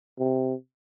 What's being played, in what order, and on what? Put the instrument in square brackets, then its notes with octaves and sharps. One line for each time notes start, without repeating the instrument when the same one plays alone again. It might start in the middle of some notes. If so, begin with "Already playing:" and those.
[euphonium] C3